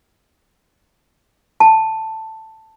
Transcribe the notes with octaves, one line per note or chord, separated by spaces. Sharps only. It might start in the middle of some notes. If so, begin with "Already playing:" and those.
A5